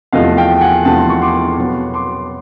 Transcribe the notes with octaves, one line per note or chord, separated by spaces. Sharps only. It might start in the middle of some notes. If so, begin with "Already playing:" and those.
E2 C3 F3 A3 D#5 F5
F5 G5
F#5 G#5
E2 C3 F3 A3 G5 A5
C6
C#6
C6 D6
B2 F#3 B3
C6 D6